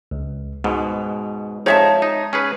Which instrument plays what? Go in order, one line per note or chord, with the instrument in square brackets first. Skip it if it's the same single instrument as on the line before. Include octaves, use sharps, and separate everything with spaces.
[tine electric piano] C#2
[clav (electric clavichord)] G#2 B2 [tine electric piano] G#3
[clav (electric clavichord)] F2 F3 D#4 [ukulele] C#5 E5 A5
[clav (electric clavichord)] D#4
C#4 G#4 B4